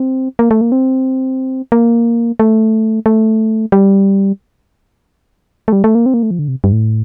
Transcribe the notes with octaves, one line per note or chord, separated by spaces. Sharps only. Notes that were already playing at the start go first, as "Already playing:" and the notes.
Already playing: C4
A#3
A3
A#3
C4
A#3
A3
A3
G3
A3
G3
A3
A#3
C4
A#3
A3
F3
D3
C3
G2
A2